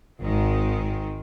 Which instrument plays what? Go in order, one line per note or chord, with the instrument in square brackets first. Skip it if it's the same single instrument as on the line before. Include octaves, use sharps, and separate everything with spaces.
[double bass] G#1 [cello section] D#3 G#3 C4